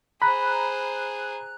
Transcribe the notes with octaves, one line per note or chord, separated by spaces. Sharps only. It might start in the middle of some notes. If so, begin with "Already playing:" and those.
G#4 C5 A#5 B5 F#6